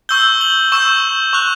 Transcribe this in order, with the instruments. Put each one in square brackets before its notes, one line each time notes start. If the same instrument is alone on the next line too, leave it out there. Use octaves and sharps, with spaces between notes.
[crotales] C#6 E6 G6 G7
F#7
C#6 E6 G6 E7
C#6 F#6 F7